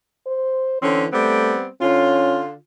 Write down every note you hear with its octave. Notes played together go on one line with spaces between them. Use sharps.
C5
D3 E3 C4 C#4
G3 A3 B3 C4
D3 C#4 F4